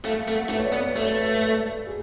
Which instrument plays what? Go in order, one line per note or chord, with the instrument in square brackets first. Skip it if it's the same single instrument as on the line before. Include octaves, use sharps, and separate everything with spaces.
[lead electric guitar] A3 [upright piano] F5
[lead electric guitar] A3
[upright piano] F#5
[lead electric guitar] A3 [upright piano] B4
[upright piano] C#5
D5
[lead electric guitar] B3
[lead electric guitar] A3 [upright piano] C#5
[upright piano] B4
A4
B4
A4
G#4